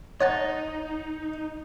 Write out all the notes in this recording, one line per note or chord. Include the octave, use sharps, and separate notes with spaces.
D#4 C#5 F#5 A5